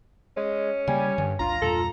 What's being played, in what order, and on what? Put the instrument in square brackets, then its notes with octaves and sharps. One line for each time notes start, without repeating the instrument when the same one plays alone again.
[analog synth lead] G#3 [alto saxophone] C#4
[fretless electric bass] C#3 A#3 [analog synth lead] G3 [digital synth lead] G#5
[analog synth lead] G2 [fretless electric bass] D3
[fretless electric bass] G#1 D2 D4 [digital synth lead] F4 [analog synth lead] A#5
[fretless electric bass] E2 G2 A#2 [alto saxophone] A4